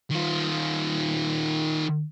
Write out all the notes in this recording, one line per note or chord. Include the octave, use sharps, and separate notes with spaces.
D#3 F4